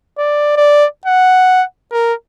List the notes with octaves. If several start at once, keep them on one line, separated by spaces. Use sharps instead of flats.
D5
D5
F#5
A#4